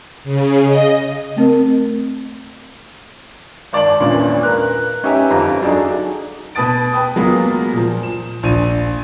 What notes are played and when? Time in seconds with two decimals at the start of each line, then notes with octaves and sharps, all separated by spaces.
0.24 C#3
0.66 D#5
1.36 A3 C4 A#4
3.73 G#1 D5 A5 F#7
4.00 G#1 E2 A#2 C#4 D4
4.43 A#4 B4 F#6
5.03 C#4 D#4 G4 B4 E5 G#5
5.31 G1 F2 F3 F5 A#5
5.62 F#3 D4 D#4 G#4 A4
6.55 B2 B4 A5 D#6 A6 D7
6.93 B4 G5 D#6
7.16 F#3 G#3 A#3 B3 F4
7.73 A#2 F3
8.03 E7
8.43 A#1 D#7